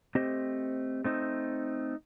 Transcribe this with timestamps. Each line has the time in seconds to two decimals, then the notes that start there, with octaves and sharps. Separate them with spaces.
0.15 A3 C4 G4 C5 D#5
1.04 A3 C4 D#4